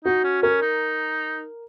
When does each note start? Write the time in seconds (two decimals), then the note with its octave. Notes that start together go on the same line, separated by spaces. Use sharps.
0.05 D#4 F#4
0.24 C#4
0.43 C#4 A#4
0.62 D#4